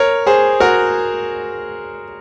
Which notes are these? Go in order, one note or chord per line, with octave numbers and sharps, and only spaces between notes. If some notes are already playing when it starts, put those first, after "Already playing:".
Already playing: A#4 C#5
G#4 C5
F#4 A#4